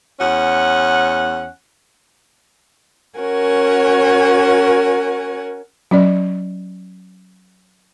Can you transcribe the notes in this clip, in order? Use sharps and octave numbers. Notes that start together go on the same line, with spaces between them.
E2 C#4 F#5
C#4 F#4 A#4 C#5 F#5 G#5
F#3 C#4 D5